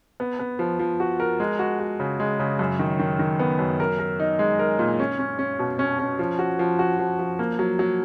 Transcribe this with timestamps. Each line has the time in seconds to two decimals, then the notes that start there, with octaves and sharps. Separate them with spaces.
0.20 B3
0.39 B3
0.59 F3
0.79 F3
1.00 F#4
1.20 A#4
1.40 G#3
1.59 F#4
1.80 F#4
2.00 C#3
2.20 G#3
2.39 C#3
2.59 F#2
2.79 D#3
2.99 D#3
3.19 D#3
3.39 B3
3.59 F#2
3.80 A#4
3.99 A#4
4.20 D#4
4.39 G#3
4.59 A#4
4.79 A#2
4.99 C#4
5.19 C#4
5.39 C#4
5.59 B2
5.79 C#4
5.99 C#4
6.19 F3
6.39 F#4
6.59 F3
6.79 F#4
6.99 F3
7.19 F3
7.39 A#3
7.59 F#3
7.79 F#3